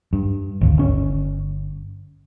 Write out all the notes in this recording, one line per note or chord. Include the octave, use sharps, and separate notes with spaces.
G2
G#1 D2
G1 C#4